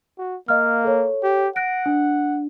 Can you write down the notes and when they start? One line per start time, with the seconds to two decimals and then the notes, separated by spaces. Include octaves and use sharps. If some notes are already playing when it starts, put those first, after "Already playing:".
0.18 F#4
0.48 A#3 D#5 F5 F6
0.84 A4 C#5
1.23 G4
1.56 F#5 F#6 A#6 D7
1.86 D4